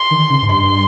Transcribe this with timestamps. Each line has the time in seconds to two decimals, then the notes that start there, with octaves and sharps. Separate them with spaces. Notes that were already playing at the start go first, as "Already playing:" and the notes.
Already playing: C6
0.11 D#3
0.30 C#3
0.42 G#2
0.49 G2 C6